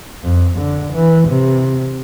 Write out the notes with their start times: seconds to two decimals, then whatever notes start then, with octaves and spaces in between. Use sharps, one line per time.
0.23 F2
0.58 D3
0.93 E3
1.28 C3